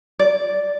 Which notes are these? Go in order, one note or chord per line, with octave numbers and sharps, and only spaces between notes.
D5